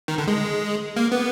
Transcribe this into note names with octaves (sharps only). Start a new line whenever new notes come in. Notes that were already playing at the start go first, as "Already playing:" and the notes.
D#3
D3
G#3
A#3
B3